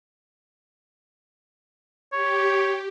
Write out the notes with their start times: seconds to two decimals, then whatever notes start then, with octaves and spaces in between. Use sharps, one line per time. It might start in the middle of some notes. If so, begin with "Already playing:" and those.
2.13 G4 C#5